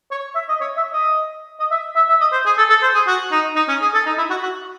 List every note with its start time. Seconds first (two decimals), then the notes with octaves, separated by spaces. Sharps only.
0.11 C#5
0.35 E5
0.49 D#5
0.61 C#5
0.77 E5
0.93 D#5
1.59 D#5
1.71 E5
1.95 E5
2.09 E5
2.21 D#5
2.32 C5
2.46 G#4
2.57 A4
2.70 A4
2.82 C5
2.94 G#4
3.07 F#4
3.32 D#4
3.56 D#4
3.68 C#4
3.81 G#4
3.94 A4
4.06 D#4
4.18 E4
4.30 F#4
4.43 F#4